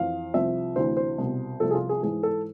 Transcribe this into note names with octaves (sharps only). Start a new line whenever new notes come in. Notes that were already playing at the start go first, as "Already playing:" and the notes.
Already playing: F2 E3 F5
C2 C3 F3 E5
D2 C3 E3 C5
C5
C2 B2
C2 C3 F3 A4
G#4
F4
G#4
G#2 E3 G#4
A4